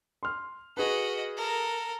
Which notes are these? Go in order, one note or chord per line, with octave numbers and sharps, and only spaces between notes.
C6 F6
F#4 G#4 B4 D#5
A4 A#4